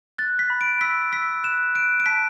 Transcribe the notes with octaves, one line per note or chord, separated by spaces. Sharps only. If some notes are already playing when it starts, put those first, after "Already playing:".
F#6 A6
B6
B5
D7
E6 B6
E6 B6
F#6 E7
F#6 D7
D7
A5 B6